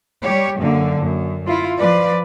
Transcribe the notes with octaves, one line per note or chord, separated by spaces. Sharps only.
G3 G4 C#5
F#2 D3 A#3
F#2
E4 F4
F3 B4 D5